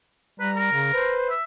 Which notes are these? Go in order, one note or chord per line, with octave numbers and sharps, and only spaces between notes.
G3 B4 A#5
A#4
C#3
B4 C5
E5